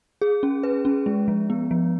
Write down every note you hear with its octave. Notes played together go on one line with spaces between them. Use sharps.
G#4
C#4
B4
C#4
G#3
F3
B3
F3